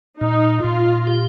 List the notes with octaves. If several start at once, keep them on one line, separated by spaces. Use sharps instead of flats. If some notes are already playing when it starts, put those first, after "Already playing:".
A#2 D#4
A#2 F4
G4